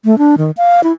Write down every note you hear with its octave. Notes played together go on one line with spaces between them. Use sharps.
A3
D4
D#3
F5
E4